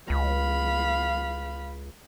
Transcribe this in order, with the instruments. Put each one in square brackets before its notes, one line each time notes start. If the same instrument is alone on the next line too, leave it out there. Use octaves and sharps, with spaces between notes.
[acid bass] C#2 [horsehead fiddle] F5 B5